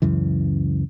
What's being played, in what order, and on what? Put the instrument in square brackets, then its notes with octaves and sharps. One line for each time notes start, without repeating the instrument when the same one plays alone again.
[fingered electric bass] C#2 F#2 C#3 E3